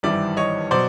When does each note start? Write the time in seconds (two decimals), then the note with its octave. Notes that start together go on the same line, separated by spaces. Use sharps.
0.03 G#1 G2 E3 G3 D5 E5
0.37 C#5 D#5
0.71 B2 F#3 C5 D5